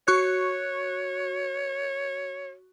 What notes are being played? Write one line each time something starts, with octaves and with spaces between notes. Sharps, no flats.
F#4 C#5 C#6 F#6